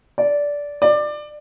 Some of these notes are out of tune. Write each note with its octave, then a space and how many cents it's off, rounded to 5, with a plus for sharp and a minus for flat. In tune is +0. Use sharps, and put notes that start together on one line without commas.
D5 -15
D5 +20